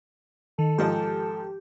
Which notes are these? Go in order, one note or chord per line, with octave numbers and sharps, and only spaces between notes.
D#3 A4
G#2 F3 D#4 G4